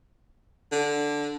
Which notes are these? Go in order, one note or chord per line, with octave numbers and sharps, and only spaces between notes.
D3